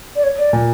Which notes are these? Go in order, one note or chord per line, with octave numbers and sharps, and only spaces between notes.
D5
C#5
D5
A#2